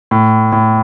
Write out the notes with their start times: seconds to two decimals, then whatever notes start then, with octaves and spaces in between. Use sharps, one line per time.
0.11 A2
0.52 A2